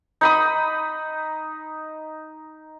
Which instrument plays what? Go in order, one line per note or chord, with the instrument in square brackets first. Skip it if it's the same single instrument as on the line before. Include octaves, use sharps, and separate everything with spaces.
[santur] D#4 B5 D#6